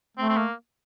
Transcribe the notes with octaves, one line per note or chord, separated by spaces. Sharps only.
A3 C4
C4
A#3